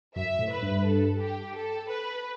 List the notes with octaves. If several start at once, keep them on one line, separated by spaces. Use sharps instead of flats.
F#2 E5
A2
B4
G2
A4
G4
A4
B4